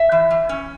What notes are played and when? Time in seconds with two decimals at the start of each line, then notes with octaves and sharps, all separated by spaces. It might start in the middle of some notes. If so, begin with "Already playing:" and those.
Already playing: E5
0.12 E3
0.31 E3
0.49 C#4